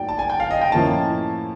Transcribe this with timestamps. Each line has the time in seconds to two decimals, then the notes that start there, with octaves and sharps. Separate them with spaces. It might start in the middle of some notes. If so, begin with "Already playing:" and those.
Already playing: A2 F#3 A#3 D#4 D5 G5
0.09 A5
0.19 G#5
0.30 G5
0.40 F5
0.51 D#5
0.61 G5
0.72 A2 F3 A#3 C#4 E4 A5